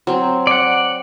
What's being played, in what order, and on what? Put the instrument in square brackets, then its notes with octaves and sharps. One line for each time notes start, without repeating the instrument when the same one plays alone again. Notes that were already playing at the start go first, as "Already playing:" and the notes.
[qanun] F#3 C4
[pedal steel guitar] D5 F#5